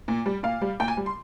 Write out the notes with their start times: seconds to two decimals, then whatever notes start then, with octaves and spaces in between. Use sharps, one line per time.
0.08 A#2
0.26 G3
0.43 A#2 F5
0.61 G3
0.80 A#2 G5
0.88 G#5
0.97 G3
1.06 C6